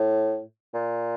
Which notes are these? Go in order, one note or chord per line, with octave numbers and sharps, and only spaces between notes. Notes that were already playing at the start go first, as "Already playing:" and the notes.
Already playing: A2
A#2